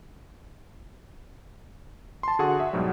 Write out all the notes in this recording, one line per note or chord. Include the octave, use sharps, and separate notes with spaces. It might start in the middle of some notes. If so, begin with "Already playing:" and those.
A5 C6
D3 F#4 G#4 A4 F#5 C#6
E5
G#2 B2 F#3 G3